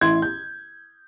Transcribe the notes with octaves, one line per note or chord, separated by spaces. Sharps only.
A1 E4 C6 G#6
G6